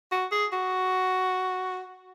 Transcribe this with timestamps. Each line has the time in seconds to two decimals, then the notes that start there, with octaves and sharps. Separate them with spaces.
0.11 F#4
0.31 G#4
0.53 F#4